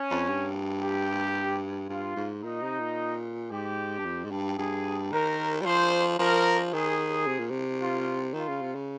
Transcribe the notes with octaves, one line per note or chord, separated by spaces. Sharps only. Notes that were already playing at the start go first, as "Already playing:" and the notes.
Already playing: C#4
F2
G2
G4
G2 F4
G#2
A#2 D#4
C3
A#2
G#2 G4
G2
F2
G#2
G2
G2 G#4
D#3 A#4
G3
F3 C5
F3 A#4
D#3 G#4
C3
A#2
C3
F4
D#3 F4
C#3
C3
C#3